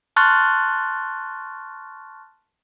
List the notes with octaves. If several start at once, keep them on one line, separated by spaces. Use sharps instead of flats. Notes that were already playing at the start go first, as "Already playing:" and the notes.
A5 C6 C#6 F6 F#6 A6